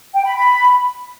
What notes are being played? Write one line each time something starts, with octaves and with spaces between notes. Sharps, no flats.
G5
B5
B5